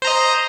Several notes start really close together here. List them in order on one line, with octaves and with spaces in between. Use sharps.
C5 A#5 D#5